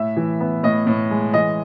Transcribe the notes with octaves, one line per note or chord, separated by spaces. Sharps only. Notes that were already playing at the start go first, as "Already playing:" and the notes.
Already playing: A2 E5
E3
B3
A2 D#5
A2
G#3
E3 D#5